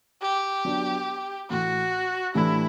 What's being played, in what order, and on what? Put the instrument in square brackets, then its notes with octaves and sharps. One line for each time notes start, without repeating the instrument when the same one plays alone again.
[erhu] G4
[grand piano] F#3 B3 D4
[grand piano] A2 E3 A3 [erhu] F#4
[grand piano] A2 E3 A3 D4 G4 [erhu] E4